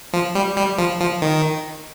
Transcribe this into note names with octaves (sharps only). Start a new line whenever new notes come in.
F3
G3
G3
F3
F3
D#3